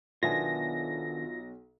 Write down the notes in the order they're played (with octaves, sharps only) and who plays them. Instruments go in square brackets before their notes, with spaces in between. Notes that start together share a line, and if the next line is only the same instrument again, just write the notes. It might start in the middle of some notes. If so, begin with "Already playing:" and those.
[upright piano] B1 [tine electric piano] D#3 B3 D4 [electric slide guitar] F4 E5 G#5 [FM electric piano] A#6